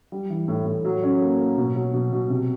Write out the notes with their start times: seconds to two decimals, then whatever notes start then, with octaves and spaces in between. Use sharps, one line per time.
0.12 G3
0.30 E3
0.48 A2
0.66 A2
0.85 F#3
1.03 C#4
1.22 A#3
1.40 A#3
1.58 B2
1.75 F#3
1.94 B2
2.13 B2
2.30 C3